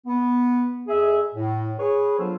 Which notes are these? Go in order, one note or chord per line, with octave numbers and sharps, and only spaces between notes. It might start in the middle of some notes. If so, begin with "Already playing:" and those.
B3
F2 G#4 E5
A2
G#4 B4 C#5
F#3 B3 D4 F4 A4 C5